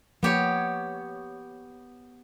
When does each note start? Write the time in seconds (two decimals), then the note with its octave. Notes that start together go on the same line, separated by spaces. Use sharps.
0.23 F3 A#3 B3 G4 C#5